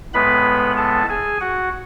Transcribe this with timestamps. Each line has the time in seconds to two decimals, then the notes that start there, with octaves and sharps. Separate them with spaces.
0.14 A2 G#3 B3 B4 B5
0.77 A4 A5
1.09 G#4 G#5
1.41 F#4 F#5